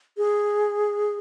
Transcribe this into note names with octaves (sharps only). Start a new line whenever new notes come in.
G#4